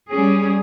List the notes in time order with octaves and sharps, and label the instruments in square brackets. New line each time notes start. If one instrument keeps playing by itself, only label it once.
[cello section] G3 C#4 G#4